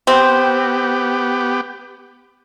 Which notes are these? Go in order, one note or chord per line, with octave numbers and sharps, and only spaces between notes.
B3 C4 G4